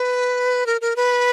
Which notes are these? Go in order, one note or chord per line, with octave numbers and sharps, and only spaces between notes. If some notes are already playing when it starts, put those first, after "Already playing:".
Already playing: B4
A#4
A#4
B4